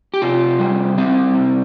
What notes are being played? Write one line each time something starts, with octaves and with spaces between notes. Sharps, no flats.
G4
C3 F4
G3
G3 C4
C3